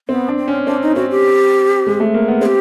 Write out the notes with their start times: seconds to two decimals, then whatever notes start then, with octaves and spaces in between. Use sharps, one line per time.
0.09 B3 C4
0.28 D4
0.39 C4
0.48 C#4
0.66 C4 D4
0.82 D#4
0.95 C4 F#4
1.11 G4
1.87 G#3
2.00 A3
2.14 A#3
2.28 B3
2.41 C4 G#4
2.46 G4